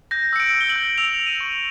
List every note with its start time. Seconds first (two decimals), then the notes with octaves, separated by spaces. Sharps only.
0.11 G6 A#6
0.33 E6 C#7
0.40 D7
0.54 E6
0.61 G7
0.70 F#7
0.76 G6
0.98 E6 F7
1.20 E6
1.27 D#7
1.40 C#6